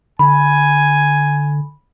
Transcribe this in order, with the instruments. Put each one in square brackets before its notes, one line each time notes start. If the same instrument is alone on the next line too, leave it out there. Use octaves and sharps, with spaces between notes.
[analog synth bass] D3 [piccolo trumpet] G#5 [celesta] B5